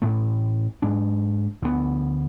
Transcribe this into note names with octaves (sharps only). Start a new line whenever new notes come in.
A1 A2 E3 A3
G#2 G#3 D4
D2 D3 F#3 B3